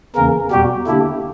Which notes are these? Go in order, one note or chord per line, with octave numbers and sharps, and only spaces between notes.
E2 C#3 E3 A#3 C#4 A#4
E2 B2 G3 B3 F#4 G4
D3 A#3 D4 E4 G4